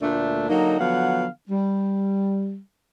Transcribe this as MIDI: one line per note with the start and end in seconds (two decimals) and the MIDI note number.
0.02 0.46 38
0.02 0.46 46
0.02 0.46 57
0.02 0.46 62
0.49 0.77 50
0.49 0.77 54
0.49 0.77 58
0.49 0.77 63
0.79 1.27 50
0.79 1.27 53
0.79 1.27 54
0.79 1.27 59
0.79 1.27 77
0.79 1.27 78
1.50 2.59 55